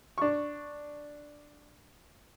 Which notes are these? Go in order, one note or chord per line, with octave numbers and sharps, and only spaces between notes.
D4 C#6